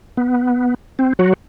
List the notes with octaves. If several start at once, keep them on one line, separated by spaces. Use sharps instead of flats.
B3
C4
F#3 F#4